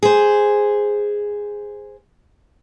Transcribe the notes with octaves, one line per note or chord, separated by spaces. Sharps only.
G#4 C5